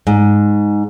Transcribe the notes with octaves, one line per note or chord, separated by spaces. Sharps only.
G#2